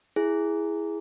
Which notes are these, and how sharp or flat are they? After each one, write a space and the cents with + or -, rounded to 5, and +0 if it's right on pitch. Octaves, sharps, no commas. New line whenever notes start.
E4 +0 G#4 +0